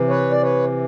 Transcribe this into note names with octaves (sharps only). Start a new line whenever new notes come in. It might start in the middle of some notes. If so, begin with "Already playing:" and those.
Already playing: C3 E3
B4 C#5
D5
B4 C#5